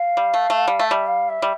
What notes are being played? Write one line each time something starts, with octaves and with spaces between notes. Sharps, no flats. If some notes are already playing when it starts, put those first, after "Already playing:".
Already playing: F5
G3
A3
A3
G3
A3 E5
G3
F5
E5
G3